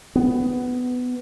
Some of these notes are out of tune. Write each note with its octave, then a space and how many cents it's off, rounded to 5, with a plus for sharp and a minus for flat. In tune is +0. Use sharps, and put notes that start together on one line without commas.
B3 +15